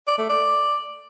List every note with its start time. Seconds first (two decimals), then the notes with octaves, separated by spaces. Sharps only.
0.08 D5
0.19 A3
0.30 D5